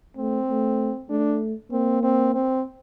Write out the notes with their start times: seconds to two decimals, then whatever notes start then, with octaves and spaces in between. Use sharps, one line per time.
0.17 A3 C4
0.48 A3
1.10 A3 D4
1.71 A#3 C4
2.03 C4
2.34 C4